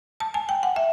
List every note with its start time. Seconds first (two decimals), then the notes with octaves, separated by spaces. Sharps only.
0.20 A5
0.34 G#5
0.49 G5
0.63 F#5
0.76 E5